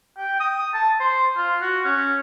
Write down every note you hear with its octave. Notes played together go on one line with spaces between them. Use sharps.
G5
D#6
A5
C5
F4
F#4
C#4